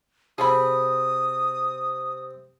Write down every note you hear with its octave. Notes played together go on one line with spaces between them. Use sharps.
C3 C4 G#4 A4 B5 D#6